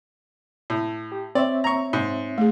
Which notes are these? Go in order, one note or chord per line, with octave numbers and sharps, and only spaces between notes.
A2
G4
C4 C#5 D5 E5
A#5 C#6
G#2
A3 G#4